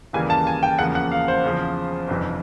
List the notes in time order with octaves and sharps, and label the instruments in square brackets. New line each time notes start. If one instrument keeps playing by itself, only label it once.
[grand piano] D#2 C#3 E3 G3 A#3 G#5
A5
G#5
G5
E2 C#3 F3 A#3 F#5
F#5
F5
C5
E2 C#3 F3
G1 F2 C3 E3